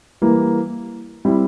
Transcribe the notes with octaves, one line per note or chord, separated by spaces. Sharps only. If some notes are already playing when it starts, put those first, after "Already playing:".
E3 G3 A#3
G3 C4 E4